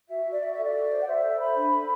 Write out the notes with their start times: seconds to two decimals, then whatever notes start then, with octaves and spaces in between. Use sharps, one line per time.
0.09 F#4 E5
0.25 F#4
0.31 D5
0.42 F#4 E5
0.53 A4 E5
0.63 D5
0.74 F#4
0.90 C5
1.00 F#5
1.06 C5 E5
1.23 A4
1.39 C5 B5
1.55 D4
1.72 A4